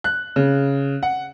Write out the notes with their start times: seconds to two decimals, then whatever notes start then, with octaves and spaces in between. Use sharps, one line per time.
0.04 F#6
0.36 C#3
1.03 F#5